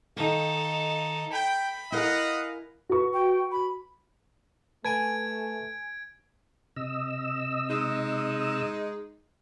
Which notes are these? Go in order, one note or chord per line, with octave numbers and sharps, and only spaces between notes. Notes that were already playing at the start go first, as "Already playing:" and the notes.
D#3 D#4 A4 F5
G5 B5
E4 A#4 D#5 F5 F#5 G#5
F#4 B4 C#6
G5
B5
A3 B4 G#5 A5 G#6 D7
C3 D#5 E6
G#3 D#4